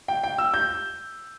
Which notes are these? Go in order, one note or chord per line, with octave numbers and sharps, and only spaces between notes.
G5
G5
E6
G6